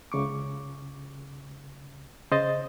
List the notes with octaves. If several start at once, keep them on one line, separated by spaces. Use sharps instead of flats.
C#2 C#3 C#6 D6
C#3 C5 D#5 A6